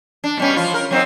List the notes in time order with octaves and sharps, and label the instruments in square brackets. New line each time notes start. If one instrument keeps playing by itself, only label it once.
[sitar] D4
B2 G3 C#4
F3 F4
A#4
F#3 C4 D#4